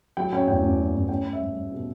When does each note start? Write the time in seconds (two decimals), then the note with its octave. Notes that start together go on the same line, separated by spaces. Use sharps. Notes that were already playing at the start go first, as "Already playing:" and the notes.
0.17 F#3 G5
0.33 C#4 G5
0.47 E2 G5
0.63 E2
0.78 F#3
0.94 E2
1.09 C#4 G5
1.24 C#4
1.33 E5
1.40 G3
1.56 G3
1.72 B2